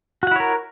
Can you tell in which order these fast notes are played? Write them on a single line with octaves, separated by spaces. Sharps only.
F#4 F#5 E4 C#5 A#4